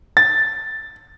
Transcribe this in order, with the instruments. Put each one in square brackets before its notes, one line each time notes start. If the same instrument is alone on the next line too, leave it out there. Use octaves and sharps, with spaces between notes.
[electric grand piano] A6